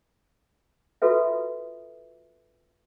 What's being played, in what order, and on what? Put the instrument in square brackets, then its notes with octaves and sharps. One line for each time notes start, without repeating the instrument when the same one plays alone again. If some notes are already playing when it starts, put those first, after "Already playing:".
[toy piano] F4 F#4 A4 B4 E5